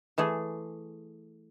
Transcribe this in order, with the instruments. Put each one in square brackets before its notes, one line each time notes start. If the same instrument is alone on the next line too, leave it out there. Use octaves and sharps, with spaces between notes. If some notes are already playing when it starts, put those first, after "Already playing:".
[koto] E3 A3 G#4